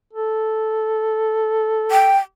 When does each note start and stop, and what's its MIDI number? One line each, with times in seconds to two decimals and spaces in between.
0.13 2.12 69
1.91 2.17 79